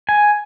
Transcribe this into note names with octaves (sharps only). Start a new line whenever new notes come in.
G#5